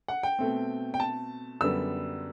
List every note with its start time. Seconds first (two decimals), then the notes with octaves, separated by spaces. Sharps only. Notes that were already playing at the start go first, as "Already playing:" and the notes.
0.08 F#5
0.23 G5
0.39 B2 A3 C4
0.94 G5
1.00 A5
1.61 F#2 D3 G3 B3 E6